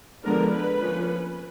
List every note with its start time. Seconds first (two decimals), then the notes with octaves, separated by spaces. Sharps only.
0.23 D3 F3 G#3 B3 D4 A#4
0.52 B4
0.80 F3 A#3 C#4